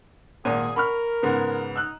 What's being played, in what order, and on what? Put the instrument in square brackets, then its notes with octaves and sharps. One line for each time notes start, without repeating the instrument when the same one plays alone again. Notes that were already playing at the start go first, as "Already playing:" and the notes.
[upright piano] G#1 A#2 D#7 [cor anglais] G#4
[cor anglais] A#4 [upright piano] B5 C#6 F6
[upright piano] G#2 C#3 B3
[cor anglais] D#4 [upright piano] E6 F#6